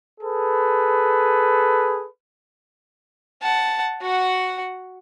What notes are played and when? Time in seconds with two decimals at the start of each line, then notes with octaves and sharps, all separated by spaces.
0.21 G#4 A4 B4
3.42 F#5 A5
4.02 F#4 F#5